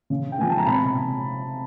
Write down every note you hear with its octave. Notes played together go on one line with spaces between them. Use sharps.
C#3
G5
F3 G#3 B3 G#5
A5
A#5
C3 A5 B5